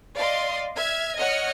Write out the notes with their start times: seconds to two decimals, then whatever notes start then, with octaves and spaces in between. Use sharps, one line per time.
0.18 D5 D#5 F5 C6
0.76 E5 F6 G#6
1.17 C#5 D#5 F#5 F6 C#7